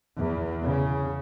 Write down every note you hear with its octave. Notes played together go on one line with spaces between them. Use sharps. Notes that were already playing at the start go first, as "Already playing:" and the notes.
E2
C#3